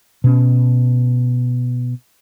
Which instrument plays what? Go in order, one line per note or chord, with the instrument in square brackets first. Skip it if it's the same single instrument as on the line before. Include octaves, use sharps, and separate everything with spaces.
[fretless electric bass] B2 C#4